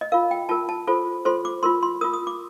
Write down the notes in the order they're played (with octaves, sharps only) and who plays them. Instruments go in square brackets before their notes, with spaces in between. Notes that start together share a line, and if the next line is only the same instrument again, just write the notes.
[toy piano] D#5
F4 A#4 F5
G5
F4 A#4 A5
A5
F4 A4 C5
F4 A4 C5 C6
D6
F4 A#4 C6
C6
F4 A#4 D#6
D#6
D6